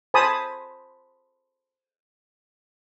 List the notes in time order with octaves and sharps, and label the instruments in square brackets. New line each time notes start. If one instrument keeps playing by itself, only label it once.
[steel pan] C5 G#5 A5 B5 D#6